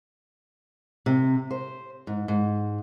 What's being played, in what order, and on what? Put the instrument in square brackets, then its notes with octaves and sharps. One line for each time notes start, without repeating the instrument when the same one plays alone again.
[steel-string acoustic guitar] C3
C5
G#2
G#2